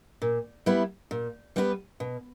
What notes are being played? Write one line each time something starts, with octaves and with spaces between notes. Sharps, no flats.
A#2
G3 B3 E4 B4
A#2
G3 B3 E4 B4
B2